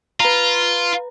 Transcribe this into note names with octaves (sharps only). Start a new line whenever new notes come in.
F4 B4 A#5